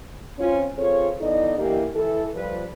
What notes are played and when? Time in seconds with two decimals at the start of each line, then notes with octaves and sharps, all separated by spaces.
0.38 C4 C#4 F4
0.78 C4 F4 G#4 A4 C#5
1.21 E3 B3 D#4 A4 D5 D#5
1.57 D3 E3 A#3 D#4 G4
1.94 E3 A4
2.35 F3 G3 B4